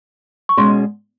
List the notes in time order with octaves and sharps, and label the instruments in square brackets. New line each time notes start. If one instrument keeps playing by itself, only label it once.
[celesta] C#6
[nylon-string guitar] B2 G#3 C#4 [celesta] C6